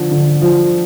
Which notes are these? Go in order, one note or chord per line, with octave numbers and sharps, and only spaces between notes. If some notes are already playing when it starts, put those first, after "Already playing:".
Already playing: D3 F3
D3
F3